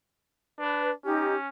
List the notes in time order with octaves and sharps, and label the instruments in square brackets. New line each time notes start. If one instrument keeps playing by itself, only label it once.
[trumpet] D4 [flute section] B4
[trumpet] C#4 [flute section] D#4 G4